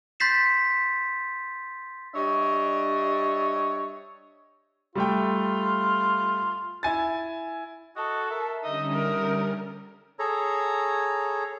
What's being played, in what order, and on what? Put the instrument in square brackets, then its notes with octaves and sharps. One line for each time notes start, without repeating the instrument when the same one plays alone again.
[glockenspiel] C6 G6 A6 B6 C7 E7
[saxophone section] G3 D4 C#5 D#5 E5
[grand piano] G3 A3 G5 [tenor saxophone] F4
[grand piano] E4 G#5 A6
[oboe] F#4 [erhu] A4 [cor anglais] D#5
[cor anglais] A#4 [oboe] E5
[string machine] D3 G3 C#4 [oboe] D#4 [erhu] D#5 [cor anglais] E5
[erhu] A#4
[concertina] G#4 A4 C#5 A#5